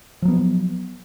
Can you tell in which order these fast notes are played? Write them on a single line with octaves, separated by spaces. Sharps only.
F3 F#3 B3